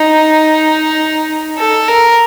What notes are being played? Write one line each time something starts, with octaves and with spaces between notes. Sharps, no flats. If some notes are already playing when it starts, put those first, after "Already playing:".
Already playing: D#4
A4
A#4